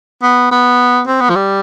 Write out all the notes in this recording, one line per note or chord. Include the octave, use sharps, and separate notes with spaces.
B3
B3
C4
B3
F3
G3